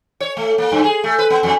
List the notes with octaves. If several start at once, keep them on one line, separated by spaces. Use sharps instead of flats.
C#5
A3
A#3
G2
G#4
A3
B4
B3
F2